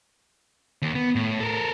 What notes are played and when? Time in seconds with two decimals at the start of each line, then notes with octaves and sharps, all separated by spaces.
0.82 D#2
0.95 B3
1.15 A2
1.40 A4 A#4